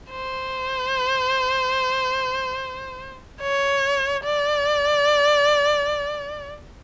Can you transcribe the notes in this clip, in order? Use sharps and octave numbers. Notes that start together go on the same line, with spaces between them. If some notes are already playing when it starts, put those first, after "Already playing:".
C5
C#5
D5